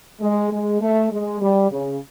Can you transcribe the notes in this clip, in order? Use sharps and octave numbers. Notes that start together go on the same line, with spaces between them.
G#3
G#3
A3
G#3
G3
C#3